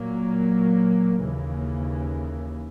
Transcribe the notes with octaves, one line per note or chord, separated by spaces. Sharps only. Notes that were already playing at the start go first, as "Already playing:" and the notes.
Already playing: A#2 F#3 A#3
D#2 C#3 E3 A#3